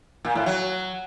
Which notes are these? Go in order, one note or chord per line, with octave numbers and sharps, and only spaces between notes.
A#2
A2
F#3